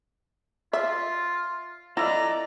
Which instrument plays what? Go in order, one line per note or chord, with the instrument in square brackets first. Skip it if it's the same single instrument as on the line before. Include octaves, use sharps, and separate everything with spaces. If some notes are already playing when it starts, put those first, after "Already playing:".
[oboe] F4 [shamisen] E5
[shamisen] E4 F4 [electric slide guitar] A4 D#5 [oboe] D5 [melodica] A#5